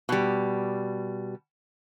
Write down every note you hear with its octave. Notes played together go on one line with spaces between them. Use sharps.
B2 G3